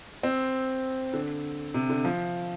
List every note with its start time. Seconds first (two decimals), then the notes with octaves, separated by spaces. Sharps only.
0.23 C4
1.14 D3
1.74 C3
1.89 D3
2.05 F3